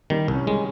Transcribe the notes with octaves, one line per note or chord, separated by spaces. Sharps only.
D#3 G3
C2
C#4
G#3